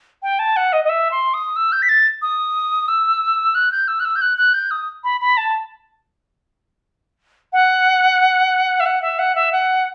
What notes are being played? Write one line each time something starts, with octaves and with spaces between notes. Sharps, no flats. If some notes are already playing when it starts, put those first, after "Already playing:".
G5
A5
F#5
D#5
D#5
E5
C6
D#6
E6
G6
B6
A6
D#6
E6
F#6
G6
E6
F#6
E6
G6
F#6
F#6
G6
D#6
B5
B5
A5
F#5
E5
F#5
E5
F#5
E5
F#5